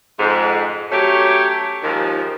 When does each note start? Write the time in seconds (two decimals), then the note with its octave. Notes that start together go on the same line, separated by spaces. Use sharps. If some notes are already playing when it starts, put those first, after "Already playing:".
0.18 F2 G#2
0.91 F#3 A3 C#4 G4 C#5
1.83 D#2 G#2 D#3 F3